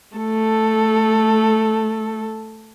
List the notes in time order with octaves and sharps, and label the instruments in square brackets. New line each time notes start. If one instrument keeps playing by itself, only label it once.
[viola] A3 A4